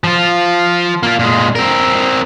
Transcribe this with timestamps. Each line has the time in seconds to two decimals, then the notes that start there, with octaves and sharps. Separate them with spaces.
0.04 F3 F4
1.03 A#3 F4
1.19 A#2 G#3
1.55 C4 A#4